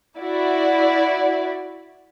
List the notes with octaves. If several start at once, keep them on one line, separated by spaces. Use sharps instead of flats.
E4 F#4 D5